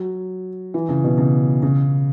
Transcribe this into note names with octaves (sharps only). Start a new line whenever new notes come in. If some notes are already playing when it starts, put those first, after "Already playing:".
Already playing: F#3
E3
C#3
B2
C#3
C#3